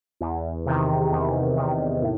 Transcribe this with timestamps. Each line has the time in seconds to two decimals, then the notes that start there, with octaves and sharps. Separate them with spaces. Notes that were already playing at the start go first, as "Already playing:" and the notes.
0.21 E2
0.66 C3 D#3
1.11 E2
1.56 C3 D#3
2.02 A2